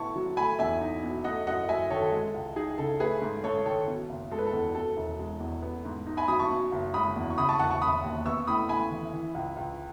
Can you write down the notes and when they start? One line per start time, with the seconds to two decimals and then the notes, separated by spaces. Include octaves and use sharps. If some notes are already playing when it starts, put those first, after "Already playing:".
Already playing: A2 B3 E4 A5 C#6
0.16 F#3
0.37 A3 G#5 B5
0.59 E2 E5 G#5
0.81 D#4
1.03 B2
1.24 A3 D#5 F#5
1.47 F#2 D#5 F#5
1.69 F#2 E5 G#5
1.91 D#3 A4 C#5
2.02 A4
2.12 G#3
2.34 C#2
2.56 D#4 G#4
2.78 C#3 A4
3.00 A3 G#4 B4
3.22 G#2
3.44 G#2 A4 C#5
3.66 D#3 A4 C#5
3.88 B2
4.10 F#1
4.31 G#3 A4
4.39 B4
4.47 A4
4.53 E2
4.75 B2 A4
4.97 E1
5.19 G#3
5.40 E2
5.62 B3
5.85 G#2
6.07 D#4
6.17 G#5 B5
6.28 F#3 B5 D#6
6.39 A5 C#6
6.50 B2
6.72 F#1
6.94 G#3 B5 D#6
7.16 E2
7.30 C#6
7.38 C#3 B5 D#6
7.49 A5 C#6
7.59 E1 F#5 A5
7.71 A5 C#6
7.82 E1 B5 D#6
8.04 D#2
8.25 B3 C#6 E6
8.47 A2 B5 D#6
8.69 A2 G#5 B5
8.91 E3
9.13 E3
9.35 C#2
9.57 C#2